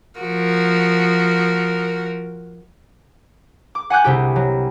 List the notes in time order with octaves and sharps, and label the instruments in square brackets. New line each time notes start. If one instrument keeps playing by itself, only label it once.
[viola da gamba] F3 F#4 A#4
[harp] D6
F#5 G#5 D6 F#6 G6
C2 C3 G4
F#3